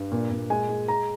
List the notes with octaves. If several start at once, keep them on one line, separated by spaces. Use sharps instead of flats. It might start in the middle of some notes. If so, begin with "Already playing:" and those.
Already playing: G2
A#2
A#2
G#3 G#5
G#3
G#3 A#5